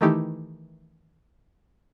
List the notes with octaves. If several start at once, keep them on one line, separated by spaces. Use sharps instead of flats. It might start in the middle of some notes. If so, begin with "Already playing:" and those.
D#3 E3 A3 D#4 E4 G4